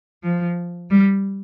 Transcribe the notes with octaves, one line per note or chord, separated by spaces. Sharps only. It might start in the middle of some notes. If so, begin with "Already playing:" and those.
F3
G3